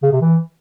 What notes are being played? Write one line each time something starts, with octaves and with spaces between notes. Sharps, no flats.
C#3
C3
E3